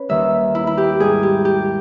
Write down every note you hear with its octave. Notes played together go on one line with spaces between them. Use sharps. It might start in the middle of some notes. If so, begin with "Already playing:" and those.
Already playing: C#4 B4
D#2 D#3 G3 E5
E4
E4
G4
G#2 G3 G#4
G4
G4